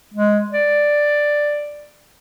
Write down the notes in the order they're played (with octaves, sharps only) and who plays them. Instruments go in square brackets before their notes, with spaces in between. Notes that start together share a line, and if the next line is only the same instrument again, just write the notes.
[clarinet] G#3
D5